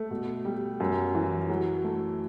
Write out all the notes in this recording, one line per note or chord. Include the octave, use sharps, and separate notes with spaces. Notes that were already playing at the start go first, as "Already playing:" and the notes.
Already playing: A3
B2
G3
F#2
E3
F#3
A3